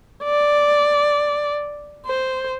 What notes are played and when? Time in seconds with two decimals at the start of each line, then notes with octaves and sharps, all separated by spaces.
0.23 D5
2.06 C5